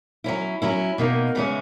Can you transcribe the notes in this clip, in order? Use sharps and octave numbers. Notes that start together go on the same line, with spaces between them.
F#3 C#4 E4
F#3 C#4 E4
B2 A#3 D#4
C#3 E3 G#3 C#4